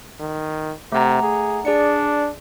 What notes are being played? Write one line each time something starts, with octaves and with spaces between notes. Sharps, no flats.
D#3
C3 A3 F#5 A#5
G#4
D4 G#4 D5 C#7